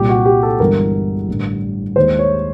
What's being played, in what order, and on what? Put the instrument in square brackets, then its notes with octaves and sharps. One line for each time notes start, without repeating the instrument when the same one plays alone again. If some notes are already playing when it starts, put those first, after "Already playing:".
Already playing: [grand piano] C2 A#2 G3 G4
F#4
G4
A4
G1 G2 E3 G#3 A#4
A1 G2 D3
D#2 D#3 G#3 C5
C#5